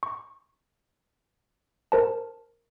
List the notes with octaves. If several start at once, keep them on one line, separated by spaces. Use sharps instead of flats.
C#6
A#4 C5 A5